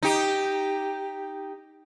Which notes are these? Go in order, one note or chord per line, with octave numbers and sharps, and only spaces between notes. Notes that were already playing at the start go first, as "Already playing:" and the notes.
D#4 G4